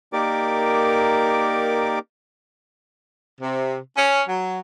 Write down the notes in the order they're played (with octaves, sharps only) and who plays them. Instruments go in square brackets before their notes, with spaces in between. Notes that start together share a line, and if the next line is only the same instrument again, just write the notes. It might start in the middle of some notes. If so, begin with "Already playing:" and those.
[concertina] A#3 D#4 G4 A#4 D5 D6
[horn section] C3
C#4
F#3